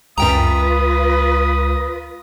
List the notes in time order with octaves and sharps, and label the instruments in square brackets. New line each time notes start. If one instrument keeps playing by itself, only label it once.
[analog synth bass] C#2 [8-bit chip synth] F#2 G5 A#5 [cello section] F4 B4 [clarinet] D#6